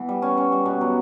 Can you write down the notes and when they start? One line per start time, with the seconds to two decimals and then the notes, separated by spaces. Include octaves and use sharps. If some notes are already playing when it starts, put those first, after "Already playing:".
Already playing: E3 B3
0.09 G3
0.22 C#4
0.37 C#4
0.52 G3
0.66 B2
0.81 F#3